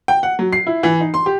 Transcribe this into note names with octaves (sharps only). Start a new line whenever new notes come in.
G5
F#5
F#3
C7
E4
E3
D#4
C6
G4